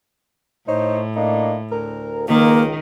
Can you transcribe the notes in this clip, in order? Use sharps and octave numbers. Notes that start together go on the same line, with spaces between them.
A2 D#4 C5 C#5
A#3 D4 D#4
D2 A#4
C#2 D#3 A#3